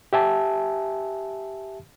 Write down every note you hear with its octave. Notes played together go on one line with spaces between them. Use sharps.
G4 E5 G#5 A5